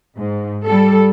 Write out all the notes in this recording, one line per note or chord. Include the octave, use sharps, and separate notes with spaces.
G#2
G3 A4